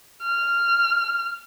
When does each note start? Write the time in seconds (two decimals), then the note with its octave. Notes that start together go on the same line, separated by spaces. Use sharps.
0.24 F6